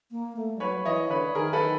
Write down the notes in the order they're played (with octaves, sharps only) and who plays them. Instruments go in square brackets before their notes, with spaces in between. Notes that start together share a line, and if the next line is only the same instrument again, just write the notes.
[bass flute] A#3
A3
G3
[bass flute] F#3 [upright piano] B4 C#5
[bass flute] E3 [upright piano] C#5 D#5
[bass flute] D3 [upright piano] B4 C#5
[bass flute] D#3 [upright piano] G#4 A#4
[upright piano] A4 B4